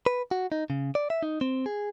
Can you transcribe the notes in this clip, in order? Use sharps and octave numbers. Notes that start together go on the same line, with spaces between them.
B4
F#4
D#4
C#3
D5
E5
D#4
C4
G#4